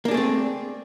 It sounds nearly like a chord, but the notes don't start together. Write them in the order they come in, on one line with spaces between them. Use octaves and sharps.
A#3 D4 G#4 A3 C4